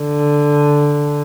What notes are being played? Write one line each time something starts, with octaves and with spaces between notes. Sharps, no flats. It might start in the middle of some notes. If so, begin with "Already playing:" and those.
Already playing: D3